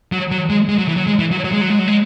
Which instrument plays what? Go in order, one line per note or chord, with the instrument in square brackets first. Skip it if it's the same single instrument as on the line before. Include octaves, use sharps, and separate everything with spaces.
[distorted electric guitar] F#3
F#3
G#3
G#3
F#3
E3
F#3
G#3
E3
F#3
F#3
G#3
F#3
G#3
F#3
G#3